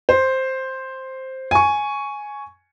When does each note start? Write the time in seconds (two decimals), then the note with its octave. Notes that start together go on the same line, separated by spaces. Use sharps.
0.09 C5
1.51 G#5 C#6